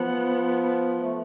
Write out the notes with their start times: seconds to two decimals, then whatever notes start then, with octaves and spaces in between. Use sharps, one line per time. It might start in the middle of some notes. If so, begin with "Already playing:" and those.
Already playing: F3 B3
1.00 A3